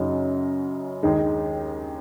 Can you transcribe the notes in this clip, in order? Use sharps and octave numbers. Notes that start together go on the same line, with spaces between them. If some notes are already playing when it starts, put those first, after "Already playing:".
Already playing: F#2 C#3 F#3 D#4
D#2 D#3 G#3 D#4